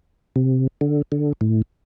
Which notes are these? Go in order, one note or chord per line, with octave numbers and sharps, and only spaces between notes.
C3
D3
D3
A2